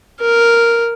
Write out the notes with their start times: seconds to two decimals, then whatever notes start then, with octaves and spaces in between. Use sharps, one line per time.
0.20 A#4